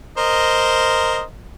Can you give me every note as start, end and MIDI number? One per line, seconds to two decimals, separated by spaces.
0.18 1.23 70
0.18 1.23 72
0.18 1.23 75